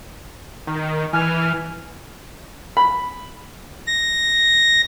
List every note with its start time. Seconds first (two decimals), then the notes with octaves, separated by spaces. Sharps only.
0.67 D#3
1.13 E3 G#5 F6
2.77 B5
3.87 A#6